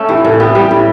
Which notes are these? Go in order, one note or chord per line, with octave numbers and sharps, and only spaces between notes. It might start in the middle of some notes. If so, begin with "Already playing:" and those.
Already playing: A3 C#4
E3 G4
A2 A4
B3 G4
G3 G4
A2